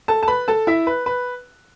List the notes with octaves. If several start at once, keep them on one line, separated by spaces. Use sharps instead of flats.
A4 A5
A5
B4 B5
A4 A5
E4 E5
B4
B4